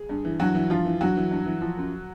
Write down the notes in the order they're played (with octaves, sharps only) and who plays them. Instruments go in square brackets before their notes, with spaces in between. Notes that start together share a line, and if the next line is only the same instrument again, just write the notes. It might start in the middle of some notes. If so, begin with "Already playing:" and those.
Already playing: [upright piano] G#4
G2
E3
G2 F#3 F#4
E3
G2 F3 F4
E3
G2 F#3 F#4
E3
G2
E3
F3
F#2